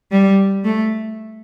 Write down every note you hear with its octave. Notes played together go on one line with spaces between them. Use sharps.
G3
A3